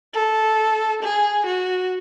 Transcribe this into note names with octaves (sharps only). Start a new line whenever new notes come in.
A4
G#4
F#4